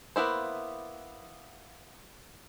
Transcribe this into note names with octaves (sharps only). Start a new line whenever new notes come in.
A#3 B3 E4 C5